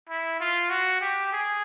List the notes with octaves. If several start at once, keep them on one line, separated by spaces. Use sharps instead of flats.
E4
F4
F#4
G4
G#4